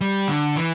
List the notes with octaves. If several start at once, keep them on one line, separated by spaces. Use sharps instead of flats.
G3
D3
E3